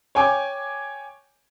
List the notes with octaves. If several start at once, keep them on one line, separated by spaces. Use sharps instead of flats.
C#5 G5 G#5 D6